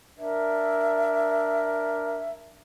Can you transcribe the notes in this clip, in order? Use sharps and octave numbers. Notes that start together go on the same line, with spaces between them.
D4 A#4 E5